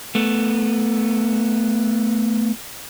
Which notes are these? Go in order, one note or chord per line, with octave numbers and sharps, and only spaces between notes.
A3 B3